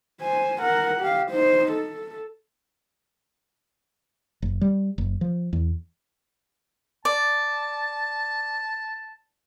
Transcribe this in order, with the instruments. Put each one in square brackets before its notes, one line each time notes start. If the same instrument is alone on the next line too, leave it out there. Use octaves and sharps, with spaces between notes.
[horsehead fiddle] C5 G#5
A#4 F#5
G4 F5
D#4 C5
A4
[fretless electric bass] F#1
G3
F#1
F3
E2
[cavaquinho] D5 [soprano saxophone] A5